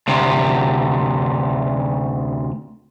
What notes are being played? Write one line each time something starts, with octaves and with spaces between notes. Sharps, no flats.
D2 C3